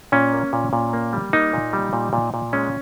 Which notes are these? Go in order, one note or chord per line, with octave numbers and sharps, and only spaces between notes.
A#2 C#4
A#3
A#2
A#2
A#3
G3
A#3 D#4
A#2
G3
A#2
A#2
A#2
G#3 C#4